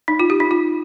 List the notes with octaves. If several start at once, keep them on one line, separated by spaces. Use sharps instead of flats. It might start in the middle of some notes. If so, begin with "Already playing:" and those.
D#4
F4
G4
D#4
F4